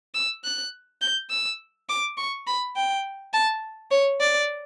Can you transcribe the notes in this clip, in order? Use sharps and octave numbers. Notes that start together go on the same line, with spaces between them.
E6
F#6
G6
E6
D6
C#6
B5
G5
A5
C#5
D5